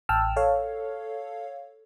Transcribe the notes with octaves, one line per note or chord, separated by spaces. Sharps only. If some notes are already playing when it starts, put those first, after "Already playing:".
A1 G5 A5 E6 F6
A4 C#5 F5